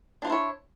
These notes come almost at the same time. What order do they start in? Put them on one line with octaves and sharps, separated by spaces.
D4 F4 C5 E4 C#5